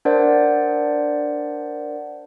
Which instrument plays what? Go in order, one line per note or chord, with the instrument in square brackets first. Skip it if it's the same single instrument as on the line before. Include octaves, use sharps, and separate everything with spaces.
[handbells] D4 A#4 C5 D5 F#5